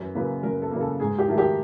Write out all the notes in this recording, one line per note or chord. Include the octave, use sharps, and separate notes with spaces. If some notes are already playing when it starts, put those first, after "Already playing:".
Already playing: F#2 B4
C#3 F#3 A#3 B4
F#2 A#4
A4
C#3 F#3 A#3
A4
G#2 G#4
G4
D#3 F#3 A3
G4